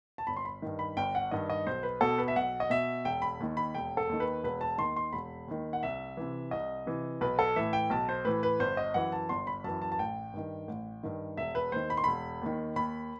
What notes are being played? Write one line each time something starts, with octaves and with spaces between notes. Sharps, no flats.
A5
G1 B5
C6
B5
G2 D#3
B5
G1 G5
F#5
G2 D#3 D#5
D#5
B1 C5
B4
B2 A4
B4
E5
B1 F#5
D#5
B2 E5
E1 G5
B5
D#2 D#3
B5
E1 G5
A4
D#2 D#3
B4
E1 B4
A5
D#2 D#3 C6
C6
E1 B5
D#2 D#3
F#5
C2 E5
C3 E3
C2 D#5
C3 E3
B1 B4
A4
A2 E3 E5
G5
B1 A5
C5
A2 E3 B4
B4
G1 C5
D#5
F#2 E3 F#5
A5
G1 C6
B5
F#2 E3 A5
A5
A5
A1 G5
G2 D#3
A1
G2 D#3
E1 E5
B4
D#2 D#3 C5
B5
C6
E1 B5
D#2 D#3
D#2 B5